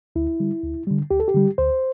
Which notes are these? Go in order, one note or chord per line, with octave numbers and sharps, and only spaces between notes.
D2 E4
D3 G3
D2
D3 G3
D2 G4
A4
G4
D3 G3
D2 C5